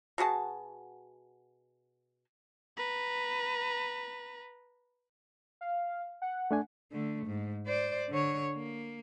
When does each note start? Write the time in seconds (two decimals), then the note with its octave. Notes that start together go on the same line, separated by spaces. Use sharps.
0.18 B2 F#4 G#4 A5
2.77 B4 A#5
5.61 F5
6.22 F#5
6.51 A3 D4 G#5
6.92 D3 A3
7.26 G#2
7.66 C5 D5
8.10 D3 C#5
8.56 A#3